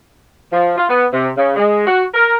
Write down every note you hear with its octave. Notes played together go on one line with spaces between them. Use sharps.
F3
F4
B3
C3
C#3
G#3
F#4
A#4